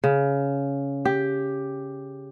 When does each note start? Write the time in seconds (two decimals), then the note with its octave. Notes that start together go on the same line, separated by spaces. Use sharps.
0.04 C#3
1.05 G4